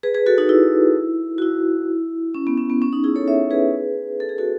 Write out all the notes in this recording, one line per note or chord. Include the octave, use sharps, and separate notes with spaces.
G#4 B4
G#4 B4
F#4 A4
D#4 F#4
E4
F#4
E4
C#4
B3
C#4
B3
C#4
D#4
E4 G#4
A4 C#5
C#5 E5
G#4 B4
A4
G#4
F#4 A4